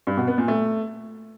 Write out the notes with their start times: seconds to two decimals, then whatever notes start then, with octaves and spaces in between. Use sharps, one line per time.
0.07 G2
0.17 B2
0.27 B3
0.38 A#2
0.48 A3